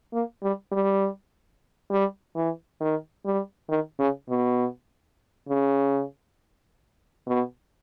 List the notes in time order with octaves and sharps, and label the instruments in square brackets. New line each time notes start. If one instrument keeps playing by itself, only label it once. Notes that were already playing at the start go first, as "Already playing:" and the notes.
[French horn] A#3
G3
G3
G3
E3
D#3
G3
D#3
C#3
B2
C#3
B2